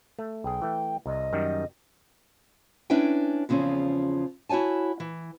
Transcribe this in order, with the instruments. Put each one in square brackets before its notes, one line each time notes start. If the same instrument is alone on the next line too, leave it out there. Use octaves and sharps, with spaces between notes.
[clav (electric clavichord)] A3
[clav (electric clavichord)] B1 G#4 [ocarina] G5
[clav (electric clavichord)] E3 A3
[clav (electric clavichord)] C2 C3 [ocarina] D#5
[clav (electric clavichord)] F#2 D#3 G3
[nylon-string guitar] C#4 D4 E4 B4 C#5 G5
E2 C#3 F3 C4 C#4
E4 F#4 C#5 G#5 A5
E3